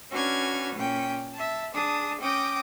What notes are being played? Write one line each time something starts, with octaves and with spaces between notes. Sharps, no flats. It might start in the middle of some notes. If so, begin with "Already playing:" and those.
C#4 D4 F#4 B4 F6 G#6
A#2 C#4 G5
E5 A5
D4 G#4 A5 D#6
C#4 G5 D6 D#6 G6 A#6